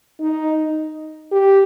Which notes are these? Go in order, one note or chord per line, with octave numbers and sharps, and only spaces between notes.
D#4
G4